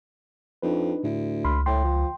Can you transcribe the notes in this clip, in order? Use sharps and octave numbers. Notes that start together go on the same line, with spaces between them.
F2 D4 D#4 B4
D2 A2 E4
C#2 B5 C6 F6
D2 A2 G5 C6
F3